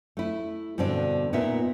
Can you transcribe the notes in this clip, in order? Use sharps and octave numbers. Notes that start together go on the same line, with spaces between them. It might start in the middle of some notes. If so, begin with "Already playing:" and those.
A3 E4
G2 B2 D3 C4 D4
A#2 B3 D#4 A#4 E5